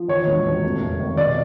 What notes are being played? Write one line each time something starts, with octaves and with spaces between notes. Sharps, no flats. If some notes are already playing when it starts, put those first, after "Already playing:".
Already playing: F3
D#3 C#5
E1
E1
F1
F1
D#3
B2 D5